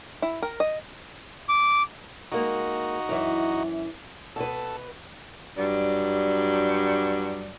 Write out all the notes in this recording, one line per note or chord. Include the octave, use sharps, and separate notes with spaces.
E4
A#4
D#5
D6
G#3 A#3 D#4 F#4
F#2 E3
B2 A4 B4
G2 F#3 D5